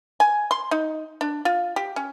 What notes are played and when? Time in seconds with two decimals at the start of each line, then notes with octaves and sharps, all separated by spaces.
0.20 G#5
0.51 C6
0.71 D#4
1.21 D4
1.45 F4
1.76 G4
1.96 C#4